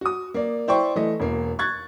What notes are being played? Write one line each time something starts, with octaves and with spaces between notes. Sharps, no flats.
F#4 D#6
A#3 D5
E4 C5 D5 G5 C#6
E3 A3 D#5
E1 A#3
C#6 F#6 G#6 A6